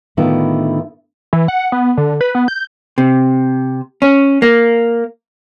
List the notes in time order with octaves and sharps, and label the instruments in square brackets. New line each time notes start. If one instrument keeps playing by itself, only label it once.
[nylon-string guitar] A2 D3 D#3 B3 E4 F4
[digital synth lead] E3
F#5
B3
D3
B4
B3
G6
[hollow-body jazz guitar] C3
C#4
A#3